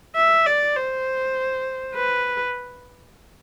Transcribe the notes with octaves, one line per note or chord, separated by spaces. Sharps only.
E5
D5
C5
B4